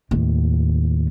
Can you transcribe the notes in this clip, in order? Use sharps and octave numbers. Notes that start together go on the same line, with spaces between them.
D#2 A2